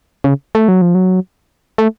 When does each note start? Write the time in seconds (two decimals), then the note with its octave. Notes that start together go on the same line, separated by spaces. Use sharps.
0.24 C#3
0.55 A3
0.68 F#3
0.82 F3
0.95 F#3
1.78 A3